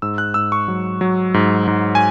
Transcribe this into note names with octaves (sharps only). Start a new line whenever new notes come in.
G#2 E6
F#6
G#2 E6
C#6
F#3
F#3
G#2
G#2
G#5